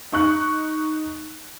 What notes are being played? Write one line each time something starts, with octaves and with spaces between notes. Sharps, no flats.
D#4 C#6 F#6